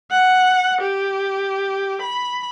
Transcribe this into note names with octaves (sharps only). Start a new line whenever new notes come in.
F#5
G4
B5